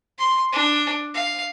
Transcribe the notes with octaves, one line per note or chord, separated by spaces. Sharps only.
C6
D4
F5